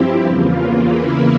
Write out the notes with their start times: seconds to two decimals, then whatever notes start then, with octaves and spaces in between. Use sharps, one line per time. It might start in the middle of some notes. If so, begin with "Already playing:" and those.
Already playing: G2 F3 C4 E4 G4
0.24 E2 C#3 E3 A#3 F4
0.85 E2 C#3 E3 A#3 E4